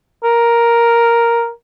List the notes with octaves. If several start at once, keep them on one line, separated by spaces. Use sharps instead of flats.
A#4